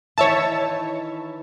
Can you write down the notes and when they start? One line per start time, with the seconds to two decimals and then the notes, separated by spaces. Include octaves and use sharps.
0.18 D#3 E3 C#5 E5 A5